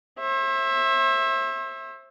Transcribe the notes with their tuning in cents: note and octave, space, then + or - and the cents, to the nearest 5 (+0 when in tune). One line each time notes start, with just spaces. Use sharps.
C5 +40 E5 +0